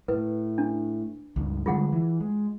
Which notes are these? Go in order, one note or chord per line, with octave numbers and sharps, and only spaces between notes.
A2 B4
D4
C#2 G2
D3 G3 G#3 F4 G#4 F#5
E3
G#3